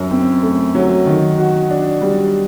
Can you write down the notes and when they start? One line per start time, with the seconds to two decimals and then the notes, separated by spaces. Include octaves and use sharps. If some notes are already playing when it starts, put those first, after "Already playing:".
Already playing: F#2
0.11 C4
0.43 A3
0.75 F#3
1.06 D#3
1.38 F#4
1.70 D4
2.02 G3